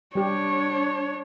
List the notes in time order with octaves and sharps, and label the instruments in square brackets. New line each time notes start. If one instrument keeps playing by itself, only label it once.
[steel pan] G3 G4 [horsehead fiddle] D4 C#5